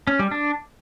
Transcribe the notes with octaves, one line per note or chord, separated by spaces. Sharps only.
C#4
G3
D4